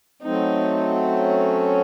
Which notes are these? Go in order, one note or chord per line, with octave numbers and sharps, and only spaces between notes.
F#3 A3 C4 D#4
C#4